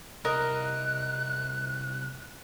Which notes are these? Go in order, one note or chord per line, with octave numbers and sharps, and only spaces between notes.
C2 A#4 D#5 F#6